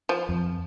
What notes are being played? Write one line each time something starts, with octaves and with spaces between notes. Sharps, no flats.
F3
F2